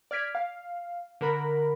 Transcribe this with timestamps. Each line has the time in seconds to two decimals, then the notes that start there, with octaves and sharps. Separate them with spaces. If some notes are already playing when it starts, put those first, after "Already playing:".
0.11 D5 F6 G#6 B6 D7
0.35 F5
1.21 D3 A#4 B5